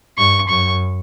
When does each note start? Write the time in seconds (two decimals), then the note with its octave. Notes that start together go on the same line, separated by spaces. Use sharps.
0.18 G2 C#6
0.49 F#2 C#6